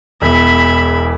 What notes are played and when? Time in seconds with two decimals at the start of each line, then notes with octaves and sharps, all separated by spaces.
0.22 E1 E2 E5 B5